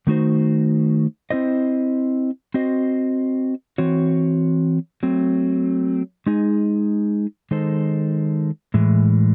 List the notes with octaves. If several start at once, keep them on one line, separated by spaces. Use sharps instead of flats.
D#3 A3 D#4 F#4 C5
C4 E4 C5 D#5
C4 F#4 C5 D#5
E3 C4 F#4 C#5
F#3 A3 C4
G#3 D#4 G#4
D#3 G#3 D#4 A4 C5
A2 E3 G#3